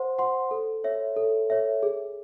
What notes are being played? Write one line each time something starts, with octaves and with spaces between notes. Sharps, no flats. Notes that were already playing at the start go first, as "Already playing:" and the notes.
Already playing: C5 F#5 C6
F#5 C6
A4
C#5 E5
A4
C#5 E5
G#4